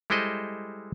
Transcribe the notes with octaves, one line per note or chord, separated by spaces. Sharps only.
G3 G#3 E4 A4 C5 D#5